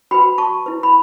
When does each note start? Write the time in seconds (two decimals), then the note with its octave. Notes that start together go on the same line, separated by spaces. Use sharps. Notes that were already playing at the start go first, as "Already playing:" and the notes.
0.11 F#4 B4 G5 B5
0.38 A5 C#6
0.66 E4 B4
0.83 B5